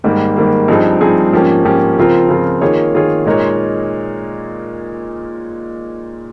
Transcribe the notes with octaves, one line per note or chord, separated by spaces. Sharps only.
G#2 D#3 G3 A#3
G#2 D#3 G3 A#3
G2 F3 C4 D#4 G#4
G2 F3 C4 D#4 G#4
G#2 F3 A#3 C#4 G4
G#2 F3 A#3 C#4 G4
C#3 F3 C4 F4 A#4
C#3 F3 C4 F4 A#4
D#3 A#3 F4 G#4 C#5
D#3 A#3 F4 G#4 C#5
A#2 G#3 D#4 A#4 C#5